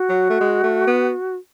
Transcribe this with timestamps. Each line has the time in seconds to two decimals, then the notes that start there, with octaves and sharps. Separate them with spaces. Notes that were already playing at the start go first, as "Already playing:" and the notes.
Already playing: F#4
0.09 F#3
0.30 A3
0.40 G#3
0.63 A3
0.87 B3